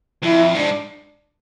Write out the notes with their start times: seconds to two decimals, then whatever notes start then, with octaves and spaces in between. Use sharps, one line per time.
0.23 F2 E4
0.55 G#2 D4